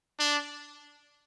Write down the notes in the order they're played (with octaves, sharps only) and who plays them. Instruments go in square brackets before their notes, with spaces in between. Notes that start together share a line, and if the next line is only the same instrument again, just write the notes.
[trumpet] D4